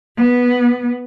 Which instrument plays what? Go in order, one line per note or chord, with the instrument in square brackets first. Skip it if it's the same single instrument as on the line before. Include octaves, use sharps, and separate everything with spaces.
[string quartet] B3